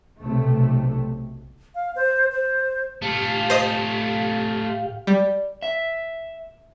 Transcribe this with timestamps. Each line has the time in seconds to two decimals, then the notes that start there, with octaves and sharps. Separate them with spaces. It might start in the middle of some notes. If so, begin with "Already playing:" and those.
0.22 B1 C3 A3
1.75 F5
1.96 C5
2.32 C5
3.02 A2 A3 F4 G4 F5
3.50 C5 D#5 D#6
5.07 G3 D5
5.62 E5